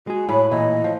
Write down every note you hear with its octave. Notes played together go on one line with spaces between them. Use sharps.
G#3 F#4 G#4
A2 B4 B5
A#2 E3 D#5
F3